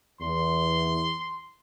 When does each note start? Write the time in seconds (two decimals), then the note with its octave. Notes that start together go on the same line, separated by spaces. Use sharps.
0.21 E2 C6